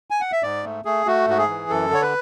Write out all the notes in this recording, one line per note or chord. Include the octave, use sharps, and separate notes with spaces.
G#5
F#5
E5
G#2 D5
A3
A3 G#4
A3 F#4
G#2 F#4
G#4
E3
F#2 A4
D3 C#5
B4